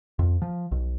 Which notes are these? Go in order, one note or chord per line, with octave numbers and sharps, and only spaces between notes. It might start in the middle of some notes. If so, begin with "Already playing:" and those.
F2
F3
B1